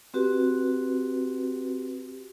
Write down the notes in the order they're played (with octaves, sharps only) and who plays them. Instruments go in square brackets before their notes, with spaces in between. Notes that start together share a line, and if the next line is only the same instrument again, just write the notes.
[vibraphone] C4 F#4 G4 B4